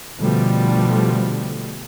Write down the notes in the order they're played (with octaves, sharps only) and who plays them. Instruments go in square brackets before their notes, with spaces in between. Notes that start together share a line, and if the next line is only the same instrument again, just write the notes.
[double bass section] B2 D3 F3 G3 A3